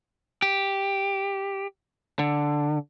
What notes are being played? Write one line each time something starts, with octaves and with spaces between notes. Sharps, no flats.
G4
D3